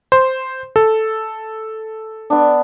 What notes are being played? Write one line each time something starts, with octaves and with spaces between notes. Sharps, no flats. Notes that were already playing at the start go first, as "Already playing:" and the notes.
C5
A4
B3 D4